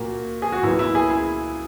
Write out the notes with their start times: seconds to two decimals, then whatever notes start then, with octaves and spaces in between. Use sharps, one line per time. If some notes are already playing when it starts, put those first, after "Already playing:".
Already playing: A#2 A#3 F#4
0.42 G#4
0.52 F#4
0.63 A#2 F#3 B3 E4
0.79 E4
0.95 G#4
1.11 E4